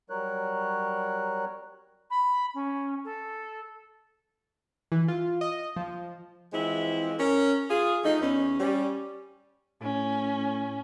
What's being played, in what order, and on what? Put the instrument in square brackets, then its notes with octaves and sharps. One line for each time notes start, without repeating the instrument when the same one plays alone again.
[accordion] F#3 G3 A#4 C#5 F#6
[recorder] B5
C#4
A4
[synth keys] E3
F4
D#5
F3
[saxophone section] E3 F3 G#3 C4 E4
C#4 A#4
F4 G#4
F3 A3 D#4
E2 C#4
G3 C#4
[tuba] A2 [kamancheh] C#4